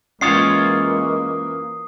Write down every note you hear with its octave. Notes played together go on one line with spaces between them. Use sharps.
E3 G#3 A#3 C#4 F4 C#5 D#6 C7